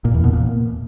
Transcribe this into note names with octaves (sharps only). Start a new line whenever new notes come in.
A#2
E2
B2
A#2